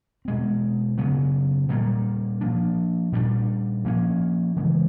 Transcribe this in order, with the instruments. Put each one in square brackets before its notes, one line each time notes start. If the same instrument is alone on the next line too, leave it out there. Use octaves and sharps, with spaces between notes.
[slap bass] B2 G#3 C4
C#3 F#3 B3
A#2 G3 A#3
F3 A#3 D4
A#2 G3 B3 D4
F3 A#3 C#4
C#3 E3 G#3